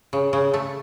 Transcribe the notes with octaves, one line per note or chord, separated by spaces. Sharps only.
C#3
C#3
A3